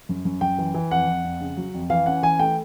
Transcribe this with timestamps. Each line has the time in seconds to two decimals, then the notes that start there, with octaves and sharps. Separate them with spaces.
0.09 F#2
0.25 F#2
0.41 F#2 G5
0.58 E3
0.74 E3
0.91 F2 F#5
1.07 F2
1.24 F2
1.41 C#3
1.57 F#3
1.74 F2
1.90 E3 F5
2.06 C#4 F#5
2.23 E3 G#5
2.39 A3 G5